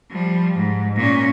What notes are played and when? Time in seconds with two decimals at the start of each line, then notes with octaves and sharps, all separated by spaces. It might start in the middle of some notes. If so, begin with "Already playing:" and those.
0.11 F3 G3
0.56 G#2
0.97 A#2 C#4